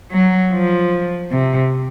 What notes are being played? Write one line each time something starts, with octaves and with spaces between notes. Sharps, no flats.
F#3
F3
C3